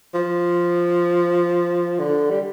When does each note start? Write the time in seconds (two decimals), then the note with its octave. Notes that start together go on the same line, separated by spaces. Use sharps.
0.14 F3
1.99 D3
2.30 G3